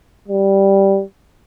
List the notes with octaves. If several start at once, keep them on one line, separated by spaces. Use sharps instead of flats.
G3